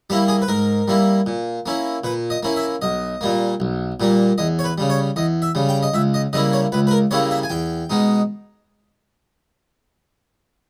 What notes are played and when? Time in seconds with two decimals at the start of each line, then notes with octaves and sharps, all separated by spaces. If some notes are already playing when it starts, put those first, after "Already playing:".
0.10 G3 A#3 E4 G4
0.28 G#4
0.42 B4
0.48 G#2 A#4
0.88 G3 A#3 E4
1.26 A#2
1.66 A#3 C#4 E4
2.04 A#2 B4
2.30 D#5
2.43 A#3 C#4 E4
2.56 E5
2.82 B1 D#5
3.21 A#2 G3 A#3
3.60 B1
4.00 A#2 G3 A#3
4.38 E2 D#5
4.59 C#5
4.64 B4
4.78 C#3 G3
4.90 C#5
5.16 E2 D#5
5.42 E5
5.55 C#3 G3
5.69 G5
5.83 D#5
5.94 C#2 E5
6.14 D#5
6.33 C#3 G3 A#3 E4 D#5
6.53 C#5
6.72 C#2 B4
6.87 B4
6.91 A#4
7.11 C#3 G3 A#3 E4 C#5
7.31 E5
7.43 G#5
7.50 E2 G5
7.90 B2 G#3 D#4